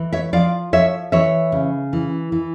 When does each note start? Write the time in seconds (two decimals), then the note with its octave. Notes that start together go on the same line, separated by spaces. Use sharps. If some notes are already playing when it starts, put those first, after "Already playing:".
Already playing: E3
0.13 C#5 E5
0.33 F3 D5 F5
0.73 F3 C#5 E5
1.12 E3 C#5 E5
1.52 C#3
1.93 E3
2.32 E3